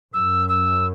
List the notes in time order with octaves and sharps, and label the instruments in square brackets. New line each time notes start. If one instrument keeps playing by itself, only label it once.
[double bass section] F#2 [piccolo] E6
[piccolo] E6